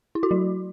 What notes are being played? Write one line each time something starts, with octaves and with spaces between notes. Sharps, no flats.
E4
F#4
F#3